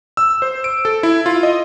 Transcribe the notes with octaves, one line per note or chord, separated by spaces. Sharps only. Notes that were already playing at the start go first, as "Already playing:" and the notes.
E6
C5
D7
A4
E4
F4
D#5